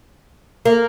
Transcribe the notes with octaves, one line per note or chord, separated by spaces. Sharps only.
A#3